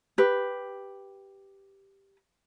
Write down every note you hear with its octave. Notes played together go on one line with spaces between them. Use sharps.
G4 B4